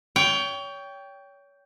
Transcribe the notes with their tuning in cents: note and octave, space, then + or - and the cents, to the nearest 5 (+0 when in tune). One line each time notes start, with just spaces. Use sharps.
C#5 +30 G5 +0